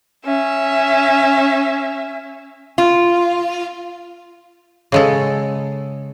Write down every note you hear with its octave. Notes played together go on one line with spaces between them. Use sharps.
C#4 E5
F4
C#3 G#3 A4